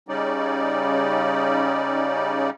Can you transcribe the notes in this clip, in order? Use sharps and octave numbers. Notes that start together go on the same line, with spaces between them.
C#3 G3 C#4 D#4 D5